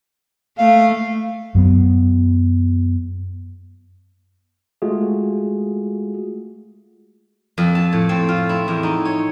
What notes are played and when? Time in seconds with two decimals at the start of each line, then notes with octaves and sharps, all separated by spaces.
0.58 A3 F5
1.55 F#2 F#3 B3
4.82 G#3 A3 F4 F#4 G#4
7.58 F2
7.75 A5
7.92 A2
8.09 C4
8.29 F4
8.49 E4
8.68 E2
8.83 D#4
9.05 C#5